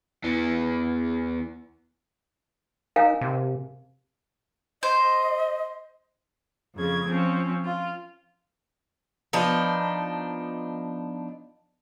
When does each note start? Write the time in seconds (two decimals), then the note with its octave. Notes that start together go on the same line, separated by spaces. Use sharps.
0.24 E2 E3
2.96 D#4 A#4 F5 G#5
3.21 C3
4.83 C5 D#5
6.76 F2 C#3 G#6
7.06 F3 C4 C#4
7.64 F4
9.33 F3 B3 D4 D#4